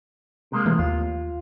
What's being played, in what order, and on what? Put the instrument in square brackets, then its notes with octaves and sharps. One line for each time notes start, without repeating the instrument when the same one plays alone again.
[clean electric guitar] C3 G#3 A#3
[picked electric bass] E3 A3
[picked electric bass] D#2 [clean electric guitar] F4